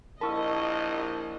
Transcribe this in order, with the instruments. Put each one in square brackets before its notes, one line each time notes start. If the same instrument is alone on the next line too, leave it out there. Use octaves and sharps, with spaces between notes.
[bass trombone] A#1 [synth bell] E4 A#4 [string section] D#5 [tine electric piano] A5 C#6 E6